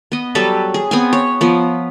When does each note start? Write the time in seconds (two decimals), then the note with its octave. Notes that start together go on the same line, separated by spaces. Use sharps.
0.12 B3 D#5
0.35 F#3 G3 A4 B4
0.74 G#4
0.91 B3 C4 G#5
1.13 C#5
1.41 F3 B3